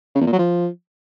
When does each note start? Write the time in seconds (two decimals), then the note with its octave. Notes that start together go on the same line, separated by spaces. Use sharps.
0.15 C#3
0.21 E2
0.27 A#2
0.33 F#3
0.39 F3